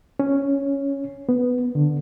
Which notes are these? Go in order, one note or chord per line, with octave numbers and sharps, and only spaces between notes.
C#4
B3
D3